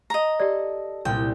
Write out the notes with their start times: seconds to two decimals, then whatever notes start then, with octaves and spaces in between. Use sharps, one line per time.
0.10 D#5 A#5
0.40 G4 A4 D5
1.05 C2 A#2 G5